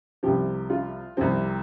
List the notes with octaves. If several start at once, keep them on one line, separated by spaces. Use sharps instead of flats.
C2 C3 F3 G4
F4
C2 C3 F3 C4